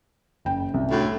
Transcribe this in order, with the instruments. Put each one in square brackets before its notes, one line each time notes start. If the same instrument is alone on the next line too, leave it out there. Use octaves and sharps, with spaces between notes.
[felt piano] F#1 G5
C2
[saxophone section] D2 A2